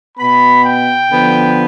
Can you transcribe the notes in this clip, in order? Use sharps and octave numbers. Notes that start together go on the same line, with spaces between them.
B2 B3 B5
G5
D3 F3 B3